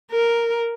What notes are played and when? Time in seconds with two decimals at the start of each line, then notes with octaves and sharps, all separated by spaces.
0.11 A#4